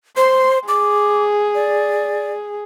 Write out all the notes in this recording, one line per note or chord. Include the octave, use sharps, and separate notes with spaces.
C5 C6
G#4 D6
D5